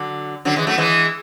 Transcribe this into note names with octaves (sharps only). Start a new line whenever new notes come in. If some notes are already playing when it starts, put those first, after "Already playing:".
Already playing: D3 F#3
D3 F#3
E3 G#3
F#3 A3
E3 G#3